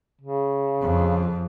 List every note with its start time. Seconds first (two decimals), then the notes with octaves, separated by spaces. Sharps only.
0.21 C#3
0.81 F2